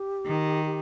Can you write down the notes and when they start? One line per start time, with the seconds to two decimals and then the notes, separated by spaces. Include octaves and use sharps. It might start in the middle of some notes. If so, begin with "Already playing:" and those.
Already playing: G4
0.26 D#3
0.66 G4